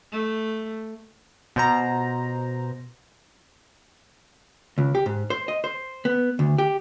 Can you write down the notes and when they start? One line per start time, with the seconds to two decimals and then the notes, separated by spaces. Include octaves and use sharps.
0.12 A3
1.56 B2 C5 A#5
4.78 C#2
4.95 G4
5.06 G#2
5.30 C5
5.48 D#5
5.64 C5
6.05 B3
6.39 D2
6.58 G4